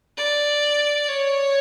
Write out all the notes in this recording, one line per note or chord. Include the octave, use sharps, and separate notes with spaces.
D5
C#5